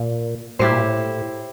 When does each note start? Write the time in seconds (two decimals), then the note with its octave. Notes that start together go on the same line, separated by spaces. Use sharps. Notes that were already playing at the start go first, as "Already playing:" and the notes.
Already playing: A#2
0.59 A2 E4 G4 C5
0.71 A#2
0.81 A2